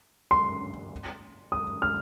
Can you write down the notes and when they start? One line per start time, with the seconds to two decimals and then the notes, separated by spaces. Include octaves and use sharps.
0.31 C6
1.52 D#6
1.82 F6